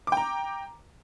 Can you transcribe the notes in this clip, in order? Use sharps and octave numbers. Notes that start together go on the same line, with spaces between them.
G5 A#5 D6